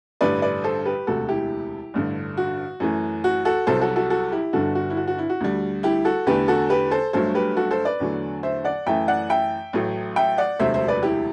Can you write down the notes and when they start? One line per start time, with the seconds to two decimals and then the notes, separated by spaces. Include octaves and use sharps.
0.21 A1 G2 D3 G3 B4 D5
0.42 B4 D5
0.64 A4 C5
0.86 G4 B4
1.07 E1 D2 C3 F#4 A4
1.29 E4 G4
1.94 A1 G2 D3
2.37 F#4
2.80 F#2 E3 A3
3.24 F#4
3.45 F#4 A4
3.67 C2 C3 F#3 A4 C5
3.81 F#4 A4
3.96 F#4 A4
4.10 F#4 A4
4.32 E4 G4
4.53 G1 G2 D3 F#4 A4
4.75 F#4
4.90 E4
4.97 F#4
5.08 F#4
5.18 E4
5.30 F#4
5.40 D2 D3 G3
5.83 E4 G4
6.05 F#4 A4
6.27 E2 D3 A3 G4 B4
6.48 F#4 A4
6.70 G4 B4
6.91 A4 C5
7.13 G1 G2 F#3 A3 A4 C5
7.35 G4 B4
7.57 F#4 A4
7.71 A4 C5
7.85 B4 D5
8.00 E2 D3 F#3 A3
8.43 C5 E5
8.64 D5 F#5
8.86 F#2 E3 A3 E5 G5
9.08 D5 F#5
9.30 E5 G5
9.73 A1 A2 F#3 A3
10.16 E5 G5
10.38 D5 F#5
10.59 E1 D2 C3 F#3 A3 C5 E5
10.74 C5 E5
10.88 B4 D5
11.03 E4 G4